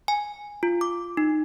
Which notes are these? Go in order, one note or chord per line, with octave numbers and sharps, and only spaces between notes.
G#5
F4
D6
D#4